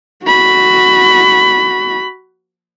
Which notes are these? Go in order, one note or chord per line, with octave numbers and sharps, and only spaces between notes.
F#4 B5